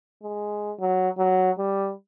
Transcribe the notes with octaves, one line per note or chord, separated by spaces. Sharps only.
G#3
F#3
F#3
G3